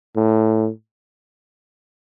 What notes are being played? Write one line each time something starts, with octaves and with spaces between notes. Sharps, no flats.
A2